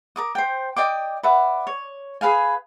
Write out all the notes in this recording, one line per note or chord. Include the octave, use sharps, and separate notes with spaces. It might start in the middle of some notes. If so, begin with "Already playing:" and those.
A#4 D6 D#6
C5 G5
D5 D#5 G5 D6
B4 D5 E5 F#5
C#5
G#4 B4 F5 G#5